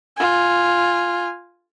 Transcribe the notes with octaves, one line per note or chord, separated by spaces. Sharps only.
F4 G#5